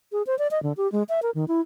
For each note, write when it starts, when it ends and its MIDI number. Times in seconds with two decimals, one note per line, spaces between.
0.12 0.22 68
0.27 0.38 72
0.39 0.47 74
0.51 0.61 75
0.63 0.73 50
0.77 0.90 67
0.92 1.03 56
1.09 1.20 76
1.22 1.31 70
1.35 1.45 51
1.48 1.61 64